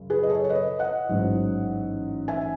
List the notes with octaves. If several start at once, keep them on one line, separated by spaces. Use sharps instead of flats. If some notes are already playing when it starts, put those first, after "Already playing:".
Already playing: F#2 C#3
G#4 B4
D#5
A4 C#5
C#5
B4 D#5
D#5 F#5
A1 G#2 F#3
E5 G#5